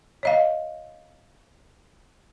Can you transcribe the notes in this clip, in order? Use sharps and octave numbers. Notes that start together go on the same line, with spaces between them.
C#5 D#5 F5